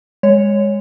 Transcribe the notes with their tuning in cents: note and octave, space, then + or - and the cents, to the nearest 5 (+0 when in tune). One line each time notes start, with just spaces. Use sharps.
G#3 -20 C#5 +0